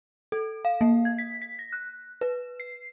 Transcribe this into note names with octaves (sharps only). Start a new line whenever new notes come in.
A4
F5
A#3
G#6
B6
B6
A#6
F#6
B4
C7